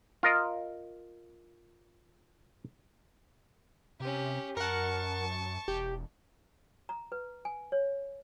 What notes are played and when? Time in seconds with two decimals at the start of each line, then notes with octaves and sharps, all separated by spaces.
0.23 F4 A#4 D#5
4.00 C3 C#4 G4
4.57 F#2 A#4 F#5 A5 C#6
5.68 E1 G4
6.89 A#5
7.12 B4
7.45 G#5
7.72 C#5